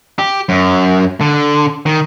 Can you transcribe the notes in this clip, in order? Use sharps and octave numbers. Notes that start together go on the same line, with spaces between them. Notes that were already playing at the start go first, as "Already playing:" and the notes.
G4
F#2
D3
D#3